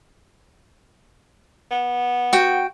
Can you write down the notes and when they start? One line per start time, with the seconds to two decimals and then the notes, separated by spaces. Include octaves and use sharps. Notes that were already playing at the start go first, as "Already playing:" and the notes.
1.71 B3
2.33 F#4 G5